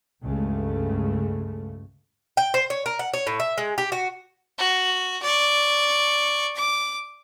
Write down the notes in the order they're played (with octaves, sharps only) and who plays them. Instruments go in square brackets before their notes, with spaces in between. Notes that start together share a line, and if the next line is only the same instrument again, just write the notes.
[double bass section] C#2 G2 C#3 G#3 A3
[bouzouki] G5
C5
C#5
A#4
F#5
C#5
A2
E5
G#3
G4
F#4
[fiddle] F#4
D5 C#6
D6